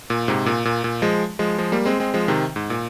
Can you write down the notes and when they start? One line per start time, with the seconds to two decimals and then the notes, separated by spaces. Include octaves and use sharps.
0.10 A#2
0.28 G#2 C3
0.46 A#2
0.65 A#2
0.84 A#2
1.02 F3 G#3
1.39 F3 G#3
1.58 F3 G#3
1.72 G3 A#3
1.85 G#3 C4
2.00 G#3 C4
2.14 F3 G#3
2.28 C3 D#3
2.56 G#2
2.70 A#2